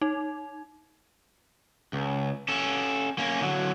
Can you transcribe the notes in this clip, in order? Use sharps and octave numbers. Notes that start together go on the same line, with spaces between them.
D#4
C#2
C#4 A4
A#3 C#4
D3 F#3